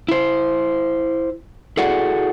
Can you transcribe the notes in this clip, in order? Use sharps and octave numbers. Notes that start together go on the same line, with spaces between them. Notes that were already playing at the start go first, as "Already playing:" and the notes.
E4 C5
E4 F#4 G#4 A4 D5 F#5